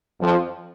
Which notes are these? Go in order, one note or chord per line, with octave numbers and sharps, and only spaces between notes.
F2 F3